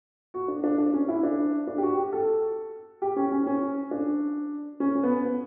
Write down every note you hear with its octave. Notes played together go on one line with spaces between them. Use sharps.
F#4
D4
D4
D4
C#4
E4
D4
D4
G4
F#4
G4
A4
G4
C#4
C#4
C#4
D4
C#4
C#4
B3
B3